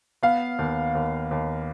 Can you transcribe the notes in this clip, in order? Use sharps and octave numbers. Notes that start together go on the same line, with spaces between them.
B3 F5
D#2
D#2
D#2